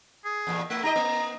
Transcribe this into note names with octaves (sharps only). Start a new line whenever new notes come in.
G#4
E2 A#2
A3 E4
D#4 G4 D#5 A#5
A#3